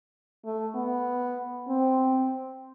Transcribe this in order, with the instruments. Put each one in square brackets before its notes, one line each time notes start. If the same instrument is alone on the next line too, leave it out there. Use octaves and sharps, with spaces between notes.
[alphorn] A3
B3
C4